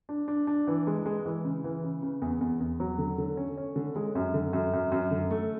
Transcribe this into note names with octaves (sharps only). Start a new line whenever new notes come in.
D4
D4
D4
E3
G#3
G#3
E3
C#3
E3
C#3
C#3
E2
E2
E2
F#3
D3
D3
C#4
C#4
D3
G#3
F#2
D3
F#2
F#2
F#2
D3
A3